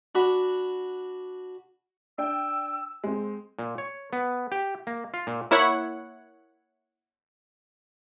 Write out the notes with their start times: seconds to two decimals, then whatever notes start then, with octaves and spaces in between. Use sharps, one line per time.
0.15 D4 F#4 B5
2.18 D4 G5 E6
3.04 G#3 C4
3.59 A#2
3.78 C#5
4.13 B3
4.52 G4
4.87 A#3
5.14 F4
5.27 A#2
5.51 A#3 E4 C#5 F#5